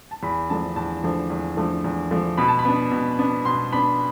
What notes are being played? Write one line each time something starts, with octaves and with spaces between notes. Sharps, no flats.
A5
E2 B5
D3 F3 A3 D4 A5
E2 A5
D3 F3 A3 D4
E2
D3 F3 A3 D4
E2
D3 F3 A3 D4
B2 B5
A5
B5
B3 D4
B2
B3 D4
B2 C6
B3 D4 B5